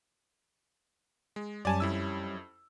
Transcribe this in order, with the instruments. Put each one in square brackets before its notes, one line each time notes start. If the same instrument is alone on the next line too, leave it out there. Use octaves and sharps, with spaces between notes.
[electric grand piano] G#3
[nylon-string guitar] F#2 G3 [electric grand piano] D5 G#5 A5
[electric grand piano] F2 E4 E6